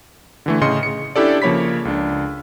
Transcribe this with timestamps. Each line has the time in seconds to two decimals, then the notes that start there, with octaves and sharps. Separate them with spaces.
0.46 D3 E3 A3
0.61 A2 C#3 D#5 C6 C#7
0.83 C#7
1.16 C#4 D4 E4 G4 A4 D5
1.42 C#3 F3 A#3 C#5 B5 B6
1.85 C#2 D4